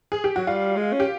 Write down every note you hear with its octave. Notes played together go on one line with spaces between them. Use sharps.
G#4
G4
F#3 F#4
G3 F4
G#3
C#4
G4